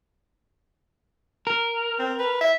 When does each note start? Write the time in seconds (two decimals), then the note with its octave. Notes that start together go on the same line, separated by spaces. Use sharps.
1.47 A#4
1.99 C4
2.20 B4
2.41 E5